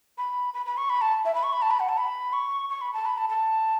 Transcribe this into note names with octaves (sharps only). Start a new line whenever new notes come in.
B5
B5
B5
C#6
B5
A5
E5
B5
C#6
B5
A5
B5
F#5
A5
B5
C#6
C#6
B5
A5
B5
A5
A5